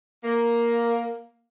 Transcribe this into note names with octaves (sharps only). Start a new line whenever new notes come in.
A#3